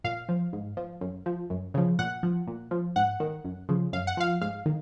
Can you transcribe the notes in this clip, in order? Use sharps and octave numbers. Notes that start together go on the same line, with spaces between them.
A#2 F5
F3
G#2
F3
F#2
F3
F#2
C#3 F3
A#2 F#5
F3
A#2
F3
G#2 F#5
D#3
F#2
C#3 F3
F#2 F5
F#5
F3 F5
G#2 F5
D#3